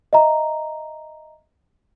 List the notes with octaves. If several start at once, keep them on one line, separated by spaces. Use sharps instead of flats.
D#5 E5 A#5